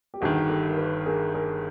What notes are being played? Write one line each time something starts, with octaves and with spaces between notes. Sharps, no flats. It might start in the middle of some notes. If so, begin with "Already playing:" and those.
G4
G1 G2 D#3 F#4 G#4
G4 A4
A#4
A4 B4
G#4 A#4
G#4 A#4